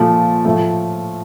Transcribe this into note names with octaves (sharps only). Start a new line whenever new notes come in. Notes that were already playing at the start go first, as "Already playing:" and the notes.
Already playing: A#2 F3 A3
A2 F3 A3